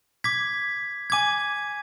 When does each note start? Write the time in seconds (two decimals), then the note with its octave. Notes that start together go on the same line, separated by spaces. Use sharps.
0.24 D6 G#6 B6
1.10 G#5 D6 G#6